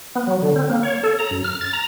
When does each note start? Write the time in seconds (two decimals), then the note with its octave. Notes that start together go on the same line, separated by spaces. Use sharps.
0.15 B3
0.27 F#3
0.42 D3
0.56 C4
0.70 A#3
0.83 C#5
1.03 A4
1.19 A#5
1.31 F#2
1.44 F6
1.61 A6
1.73 A#5